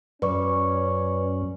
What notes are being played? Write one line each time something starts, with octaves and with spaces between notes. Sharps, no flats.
F#2 C#4 B4 D5 C#6